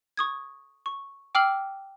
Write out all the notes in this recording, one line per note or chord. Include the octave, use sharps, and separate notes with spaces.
C#6 D#6 G#6
C#6
G5 D6 E6 F6 C7 F#7